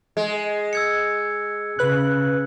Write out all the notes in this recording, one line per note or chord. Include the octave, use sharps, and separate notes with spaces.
G#3
E6 G#6 C#7
C#3 B4 F#6